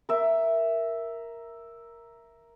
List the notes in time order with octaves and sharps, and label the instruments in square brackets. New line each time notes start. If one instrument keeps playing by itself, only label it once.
[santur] A#4 E5